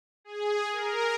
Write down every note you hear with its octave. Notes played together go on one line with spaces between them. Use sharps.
G#4
A#4